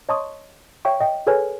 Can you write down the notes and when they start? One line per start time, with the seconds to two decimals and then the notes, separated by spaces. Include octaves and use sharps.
0.09 C#5 D#5 A5 C6 C#6 D#6
0.85 C#5 E5 G5 C#6
1.00 D#5 G5
1.27 G#4 A4 B4 C#5 G#5 F6